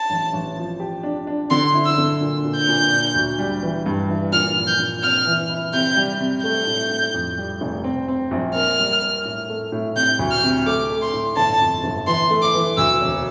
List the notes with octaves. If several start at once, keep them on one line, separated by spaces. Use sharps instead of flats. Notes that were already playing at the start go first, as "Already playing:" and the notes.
Already playing: A5
A1
A1
F3
G4
D4
D4
D3 C6
E4
E6
D3
A#2
A#2
G6
A#2
D4
D2
G3
E3
G2
E3
A#2 F6
F3
G6
A#2
C3 F6
E3
E4
C3 G6
G3
C3
A3 G6
A2
A2
F2
G3
F1
C4
C4
A#1
A#3 F6
G3
A#3
A2
A3
A2
C3 G6
D2
F6
C3
A3 D6
A3
C6
A2
G1 A5
F2
G1
E3 C6
A3
D6
E3
D2 E6
E1